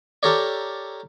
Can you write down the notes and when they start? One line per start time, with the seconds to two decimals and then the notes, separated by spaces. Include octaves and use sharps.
0.23 G4 A4 A#4 C#5 D5